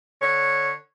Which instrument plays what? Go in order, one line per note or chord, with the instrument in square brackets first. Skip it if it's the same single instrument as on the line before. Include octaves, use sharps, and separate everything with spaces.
[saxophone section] D3 C#5